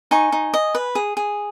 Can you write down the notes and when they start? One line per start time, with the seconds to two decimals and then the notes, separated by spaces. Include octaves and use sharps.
0.11 D#4 G#5 C#6
0.32 D#4
0.54 D#5
0.75 B4
0.95 G#4
1.17 G#4